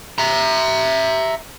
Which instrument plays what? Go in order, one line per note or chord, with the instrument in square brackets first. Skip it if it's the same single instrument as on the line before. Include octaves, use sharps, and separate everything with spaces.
[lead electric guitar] E5 A#5